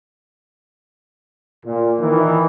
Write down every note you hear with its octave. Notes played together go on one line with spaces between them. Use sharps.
A#2
D#3 E3